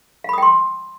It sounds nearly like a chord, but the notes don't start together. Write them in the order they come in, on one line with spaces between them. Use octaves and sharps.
F5 B5 D#6 G5 C6